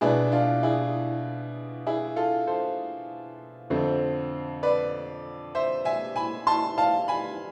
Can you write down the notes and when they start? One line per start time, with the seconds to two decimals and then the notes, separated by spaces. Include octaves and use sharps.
0.01 B2 B3 D4 E4 G#4
0.32 D4 F4
0.63 E4 G#4
1.86 E4 G#4
2.16 F4 A4
2.47 A4 C5
3.70 F2 D3 A3 C4
4.63 B4 D5
5.55 C5 E5
5.85 E5 G#5
6.16 G#5 B5
6.47 A5 C6
6.78 F5 A5
7.08 G#5 B5